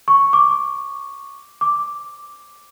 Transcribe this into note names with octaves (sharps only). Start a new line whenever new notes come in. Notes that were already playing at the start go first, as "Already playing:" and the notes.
C#6
D6
D6